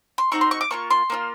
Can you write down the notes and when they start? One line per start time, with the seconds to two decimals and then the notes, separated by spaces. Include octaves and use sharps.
0.18 C6
0.32 C4 D#4 F#4 C#6
0.41 C6
0.51 C#6
0.61 D6
0.71 A#3 D4 F4 C#6
0.90 C6
1.10 A#3 D4 F4